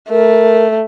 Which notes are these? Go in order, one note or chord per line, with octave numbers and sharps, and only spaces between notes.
A3 A#4